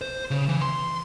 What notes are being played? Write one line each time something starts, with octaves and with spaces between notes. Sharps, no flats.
C5
C#3
E3
C6